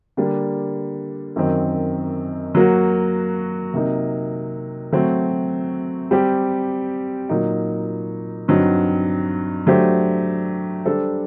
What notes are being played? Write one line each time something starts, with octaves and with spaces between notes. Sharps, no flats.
D3 G3 A#3 D4
F#2 D#3 F#3 C4
F#3 A#3 F#4
C3 F#3 A#3 D#4
F#3 A3 C4 F#4
G3 C4 G4
A#2 F#3 A#3 D#4
G2 F#3 C4 D#4
F#3 A3 D4 G4 C5
G3 D4 A4 C5